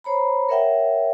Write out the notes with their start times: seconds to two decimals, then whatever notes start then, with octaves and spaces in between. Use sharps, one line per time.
0.04 C5 C#5 A#5 B5
0.49 A#4 C#5 E5 F#5 G5